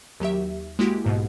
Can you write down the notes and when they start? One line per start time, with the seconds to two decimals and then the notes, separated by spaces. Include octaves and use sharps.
0.20 D#2 F#3 G4 E5
0.79 G#3 A#3 E4 F#4 G4
1.04 B1 G#2 B2